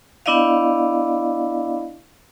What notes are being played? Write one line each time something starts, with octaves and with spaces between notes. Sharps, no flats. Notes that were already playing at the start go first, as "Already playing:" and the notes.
B3 D4 E4 D5 D#5 F5